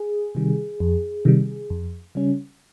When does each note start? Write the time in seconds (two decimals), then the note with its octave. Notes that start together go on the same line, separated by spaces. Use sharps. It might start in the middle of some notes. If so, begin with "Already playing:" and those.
Already playing: G#4
0.35 C3 D#3 G3
0.80 F2
1.25 C3 D#3 G3
1.70 F2
2.15 C#3 G3 C#4